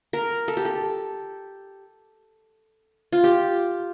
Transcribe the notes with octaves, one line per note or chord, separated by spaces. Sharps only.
A#4
A4
G4
A4
F4
G4